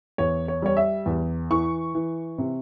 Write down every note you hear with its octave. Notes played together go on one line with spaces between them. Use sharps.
E2 C#5
C#5
G3 C#5
E5
E2
E3 C#6
E3
C3